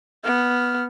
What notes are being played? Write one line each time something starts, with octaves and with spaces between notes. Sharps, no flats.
B3 F6